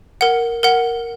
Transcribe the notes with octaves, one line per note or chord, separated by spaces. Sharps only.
A#4 F#5
A#4 F#5